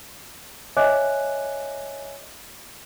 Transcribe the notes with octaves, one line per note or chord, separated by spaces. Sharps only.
C#5 D#5 E5 G#5 D6 F#6